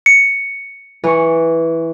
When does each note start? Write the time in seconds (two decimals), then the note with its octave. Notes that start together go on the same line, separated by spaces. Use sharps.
0.06 C#7
1.04 E3 C#6